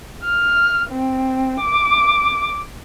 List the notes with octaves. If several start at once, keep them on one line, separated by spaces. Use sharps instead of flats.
F6
C4
D6